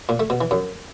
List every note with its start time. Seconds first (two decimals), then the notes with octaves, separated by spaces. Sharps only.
0.09 A#2
0.20 A3
0.30 B2
0.41 E3
0.51 F#2